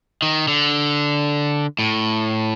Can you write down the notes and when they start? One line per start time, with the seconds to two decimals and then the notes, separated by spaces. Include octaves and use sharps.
0.22 D#3
0.48 D3
1.79 A2